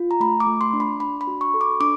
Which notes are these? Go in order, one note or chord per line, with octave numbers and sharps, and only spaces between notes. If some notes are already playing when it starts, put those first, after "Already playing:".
Already playing: F4
A#5
A3 B5
D6
A3
C6
D4
B5
D4 B5
B5
F#4
C#6
A4
D6
D4 D6